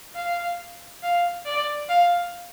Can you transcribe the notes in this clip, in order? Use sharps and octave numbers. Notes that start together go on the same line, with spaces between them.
F5
F5
D5
F5